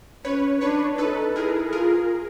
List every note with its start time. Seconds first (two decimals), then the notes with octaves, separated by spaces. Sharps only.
0.25 C#4 B4 C#5
0.61 D4 B4 C#5
0.98 D#4 A4 B4
1.36 E4 G#4 A#4
1.72 F4 G#4 A#4